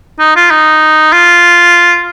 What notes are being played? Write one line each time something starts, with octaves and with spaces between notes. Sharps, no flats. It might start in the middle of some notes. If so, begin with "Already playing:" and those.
D#4
F4
D#4
F4